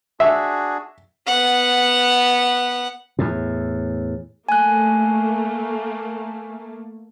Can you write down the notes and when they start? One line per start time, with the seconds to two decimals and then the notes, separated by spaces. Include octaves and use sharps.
0.20 D4 F#4 G#4 E5
1.27 B3 F#5
3.19 E2 A2
4.49 A3 A#3 G#5 F#6